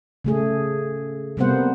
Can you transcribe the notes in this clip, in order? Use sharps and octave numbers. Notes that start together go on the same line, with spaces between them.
C#3 A3 G#4
C3 G3 A#3 B3 C5 F#5